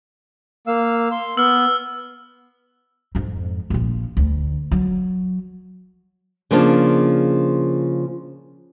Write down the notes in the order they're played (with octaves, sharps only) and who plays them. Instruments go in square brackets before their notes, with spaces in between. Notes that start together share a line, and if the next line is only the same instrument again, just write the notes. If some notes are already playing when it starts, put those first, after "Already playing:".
[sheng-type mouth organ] A#3 F5 E6
C6
[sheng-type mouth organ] B3 [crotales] E6 F6
[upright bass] F2 G#2
A#1 F3
D2
F#3
[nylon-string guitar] C#3 F3 A#3 D4